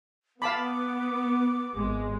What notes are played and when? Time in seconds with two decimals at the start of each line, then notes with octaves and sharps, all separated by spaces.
0.42 B3 F5 A5 B5 D6
1.74 G#1 G#3